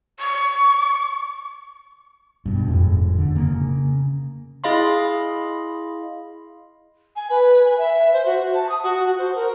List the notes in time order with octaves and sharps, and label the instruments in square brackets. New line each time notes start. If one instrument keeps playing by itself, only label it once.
[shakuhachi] C#6
[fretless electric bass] G2 B2
F1 F2 A2 G#3
D3
C#3 A#3
[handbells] E4 G#4 D#5 F5 B5 C6
[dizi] G#5
B4
G#5
E5
C5
F#4
A5
D#6
F#4
F#4
C5
A#4